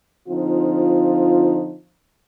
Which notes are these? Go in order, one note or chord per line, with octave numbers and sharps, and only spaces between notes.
D3 F3 C4 D#4 F4